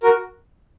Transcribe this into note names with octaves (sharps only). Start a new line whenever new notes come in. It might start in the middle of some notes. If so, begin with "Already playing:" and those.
F#4 A#4